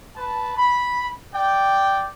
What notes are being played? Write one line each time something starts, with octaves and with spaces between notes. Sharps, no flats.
B4 A5
B5
D5 G5